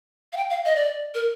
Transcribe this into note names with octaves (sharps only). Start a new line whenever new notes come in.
F5
G5
F5
D#5
D5
A#4